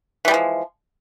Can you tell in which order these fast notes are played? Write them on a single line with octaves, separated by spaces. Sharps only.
E3 G3 G#3 F3